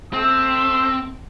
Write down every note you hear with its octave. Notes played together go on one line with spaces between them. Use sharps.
A3 C4 E6